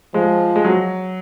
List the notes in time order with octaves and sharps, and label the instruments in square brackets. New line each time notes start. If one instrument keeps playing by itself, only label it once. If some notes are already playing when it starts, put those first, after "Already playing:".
[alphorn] F3 [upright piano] G#3
[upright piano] G#3
F#3